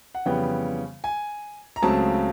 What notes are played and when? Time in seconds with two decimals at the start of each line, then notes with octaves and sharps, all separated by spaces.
0.15 F#5
0.26 F2 C#3 E3 G3 B3 G5
1.04 G#5
1.76 A#5
1.82 C#2 C#3 F#3 A3 C4 A5